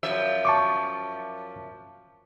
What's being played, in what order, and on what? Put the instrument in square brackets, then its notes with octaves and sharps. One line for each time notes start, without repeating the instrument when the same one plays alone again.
[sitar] F#2 F3 E5
[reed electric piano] A5 C#6 D6